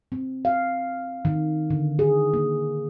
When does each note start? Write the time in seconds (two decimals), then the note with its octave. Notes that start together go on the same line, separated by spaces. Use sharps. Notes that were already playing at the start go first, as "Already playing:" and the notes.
0.12 C4
0.45 F5
1.25 D#3
1.70 D3
1.99 G#4
2.34 A#3